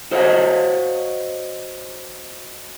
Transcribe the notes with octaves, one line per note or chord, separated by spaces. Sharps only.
F#4 C5 C#5 D#5 F5 F#5